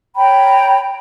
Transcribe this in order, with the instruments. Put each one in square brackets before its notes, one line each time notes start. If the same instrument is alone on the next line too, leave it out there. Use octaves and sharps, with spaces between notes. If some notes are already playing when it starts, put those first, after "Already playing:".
[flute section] C#5 G5 A#5 B5